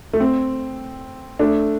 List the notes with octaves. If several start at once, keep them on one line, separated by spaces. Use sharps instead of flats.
A3
C4
A3 D4